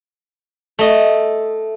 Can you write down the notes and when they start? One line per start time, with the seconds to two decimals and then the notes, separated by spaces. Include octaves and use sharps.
0.79 A3 D#5